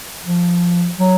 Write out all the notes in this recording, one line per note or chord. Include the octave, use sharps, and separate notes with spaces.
F3
F#3